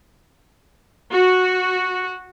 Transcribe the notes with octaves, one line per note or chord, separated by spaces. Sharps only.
F#4